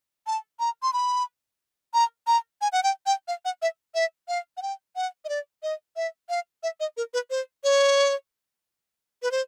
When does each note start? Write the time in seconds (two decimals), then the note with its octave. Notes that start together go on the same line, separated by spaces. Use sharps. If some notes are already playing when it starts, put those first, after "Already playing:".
0.27 A5
0.60 A#5
0.83 C6
0.93 B5
1.94 A#5
2.27 A#5
2.61 G#5
2.72 F#5
2.83 G5
3.06 G5
3.28 F5
3.45 F#5
3.62 E5
3.95 E5
4.28 F5
4.57 F#5
4.62 G5
4.96 F#5
5.25 D#5
5.29 D5
5.63 D#5
5.96 E5
6.29 F5
6.63 E5
6.80 D#5
6.97 A#4
7.14 B4
7.30 C5
7.64 C#5
9.23 B4
9.31 C5